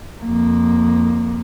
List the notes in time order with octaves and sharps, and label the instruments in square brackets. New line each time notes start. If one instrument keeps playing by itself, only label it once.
[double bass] F2 A#3